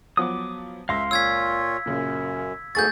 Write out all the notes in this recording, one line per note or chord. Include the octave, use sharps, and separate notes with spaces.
F3 F#3 B3 D6 D#6
C#2 E5 F5 C6 A#6
A#2 F4 C#5 E6 G#6 B6
F#2 A#2 C#3
D2 G#2 A3 B3 G#4 C#6 G6 A6